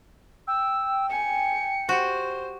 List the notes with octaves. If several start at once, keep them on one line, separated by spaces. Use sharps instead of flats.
G5 E6
G#5 C#7
F#4 G4 C5